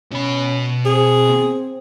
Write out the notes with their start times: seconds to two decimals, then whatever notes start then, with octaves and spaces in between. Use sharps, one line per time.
0.12 B2 C#4 B5
0.86 C4 G#4